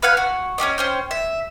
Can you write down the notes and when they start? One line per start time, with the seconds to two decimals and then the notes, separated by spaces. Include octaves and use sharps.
0.02 B4 F5 F#5 G#5
0.17 F#4
0.58 C#4 F#4 G4 D#5
0.78 C#4 C5 G5
1.11 E5